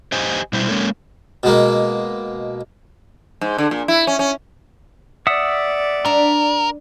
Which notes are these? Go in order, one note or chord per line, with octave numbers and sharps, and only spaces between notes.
G4 C5 D#5 G#5
B2 G3 E4 C5
G#3 A#3 C#4 A4
B2 G#3 A#3
G#2
D3
A#2
E4
C#4
C#4
D5 E5 F#5 D#6
D4 A#4